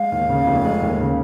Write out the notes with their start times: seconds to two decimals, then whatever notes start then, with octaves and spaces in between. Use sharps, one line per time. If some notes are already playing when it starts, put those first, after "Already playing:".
Already playing: G#3 F5
0.12 D#2
0.29 C#3
0.47 F1
0.65 G#3
0.82 D#2
1.00 C#3